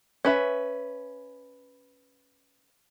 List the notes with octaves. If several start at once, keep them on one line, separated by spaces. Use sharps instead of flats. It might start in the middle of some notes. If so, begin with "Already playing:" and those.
C#4 B4 E5